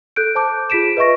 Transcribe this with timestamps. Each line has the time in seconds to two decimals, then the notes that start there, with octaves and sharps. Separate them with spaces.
0.16 A4 F#6 G6 D7
0.35 C5 A5 D6 G6
0.70 F4 G#4 B6 D7 E7
0.97 B4 D#5 E5 C#6 A#6